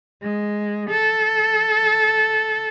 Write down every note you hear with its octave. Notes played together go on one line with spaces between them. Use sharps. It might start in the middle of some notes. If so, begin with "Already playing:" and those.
G#3
A4